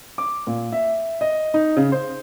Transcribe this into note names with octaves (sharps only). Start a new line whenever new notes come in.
D6
A#2
E5
D#5
D#4
C#3
C5